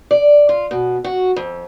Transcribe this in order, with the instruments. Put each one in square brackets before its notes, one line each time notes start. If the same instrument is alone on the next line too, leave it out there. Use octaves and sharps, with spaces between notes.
[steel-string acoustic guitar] D5
F4
B2
F#4
F2